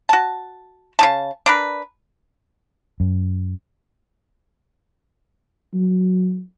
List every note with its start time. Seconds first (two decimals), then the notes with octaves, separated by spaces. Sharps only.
0.09 F#4 A5
0.99 C#3 D#4 A5
1.46 D4 A#4 B4
3.00 F#2
5.74 F#3